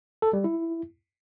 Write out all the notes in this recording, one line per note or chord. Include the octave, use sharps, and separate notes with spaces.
A4
G3
E4